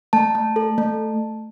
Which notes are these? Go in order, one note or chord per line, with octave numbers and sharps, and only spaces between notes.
A3 A5
A3
A4
A3